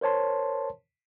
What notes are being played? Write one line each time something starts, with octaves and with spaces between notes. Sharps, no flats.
A#4 C5 C#5 A5 C6